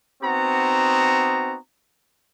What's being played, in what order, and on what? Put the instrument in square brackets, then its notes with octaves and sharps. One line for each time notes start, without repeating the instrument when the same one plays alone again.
[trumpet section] B3 C4 D#4 F#4 A#5